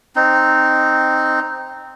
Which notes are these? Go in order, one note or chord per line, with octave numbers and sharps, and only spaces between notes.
C4 D#4